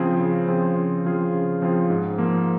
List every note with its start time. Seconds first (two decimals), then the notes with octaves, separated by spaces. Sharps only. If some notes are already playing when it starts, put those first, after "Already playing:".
Already playing: C#3 F3 C4 F4 G#4
0.20 C#3
0.48 F3 C4 F4 G#4
0.76 C#3
1.05 F3 C4 F4 G#4
1.34 C#3
1.62 F3 C4 F4 G#4
1.90 G#2
2.18 F3 A#3